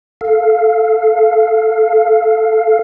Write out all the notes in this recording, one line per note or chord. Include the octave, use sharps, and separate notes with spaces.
A4 F5